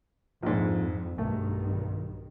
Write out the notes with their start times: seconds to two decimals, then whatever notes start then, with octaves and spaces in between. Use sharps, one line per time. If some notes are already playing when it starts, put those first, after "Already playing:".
0.43 A#1 F2 G#2
1.18 B1 G2 D#3 A3